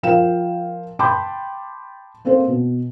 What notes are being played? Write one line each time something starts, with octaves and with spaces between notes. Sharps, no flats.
F3 A#4 F5 G5 E7
G5 A5 B5 C6 D6 G6
A#3 C4 A4 C5
B2